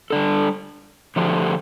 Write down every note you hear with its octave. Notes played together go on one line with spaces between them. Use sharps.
G3 D4 A4
D3 F3 A3 D4 G4